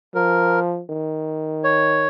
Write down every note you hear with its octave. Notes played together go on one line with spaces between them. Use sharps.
F3 A#4
D#3
C#5